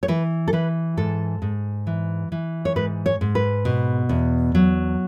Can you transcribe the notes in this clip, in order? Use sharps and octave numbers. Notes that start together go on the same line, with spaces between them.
C#5
E3 B4
A4
E3 B4
G#2 A4
G#2
E3
E3
C#5
G#2 B4
C#5
G#2
B4
B2
E2
F#3